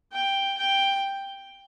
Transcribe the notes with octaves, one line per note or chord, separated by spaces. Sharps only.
G5
G5